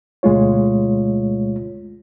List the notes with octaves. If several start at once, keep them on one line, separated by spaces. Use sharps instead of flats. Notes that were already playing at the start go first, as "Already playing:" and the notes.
D2 B2 G#3 A3 F4 C#5